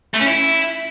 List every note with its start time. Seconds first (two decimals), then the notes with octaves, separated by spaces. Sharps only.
0.14 A3
0.20 C#4
0.26 E4